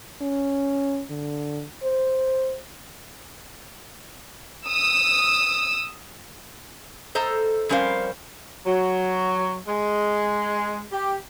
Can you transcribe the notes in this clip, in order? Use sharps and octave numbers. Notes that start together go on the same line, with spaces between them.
C#4
D3
C5
D#6 E6
A4 C5 D#5 A#5
F2 G3 C#4 A#4 C5 F5
F#3
G#3
G4